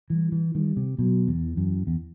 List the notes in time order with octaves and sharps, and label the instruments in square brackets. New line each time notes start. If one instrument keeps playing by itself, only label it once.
[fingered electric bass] E3 [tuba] G3
[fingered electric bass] E3
[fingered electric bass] D#3 [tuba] G3
[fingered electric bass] C3
[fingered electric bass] B2 [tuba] F#3
[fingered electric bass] E2
[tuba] E3
[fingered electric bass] F#2
E2